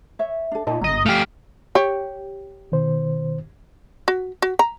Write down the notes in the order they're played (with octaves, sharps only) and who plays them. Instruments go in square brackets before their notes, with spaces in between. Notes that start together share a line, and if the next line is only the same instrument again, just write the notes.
[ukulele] C#5 E5
D4 A4
[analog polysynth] A#2 [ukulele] D#4 D#5 A5
[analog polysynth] G1 D#5 [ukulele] A#5
[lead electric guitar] A3 G4 [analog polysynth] F5 F6
[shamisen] G4 C#5
[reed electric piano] B2 D#3 C5
[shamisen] F#4
F#4
A#5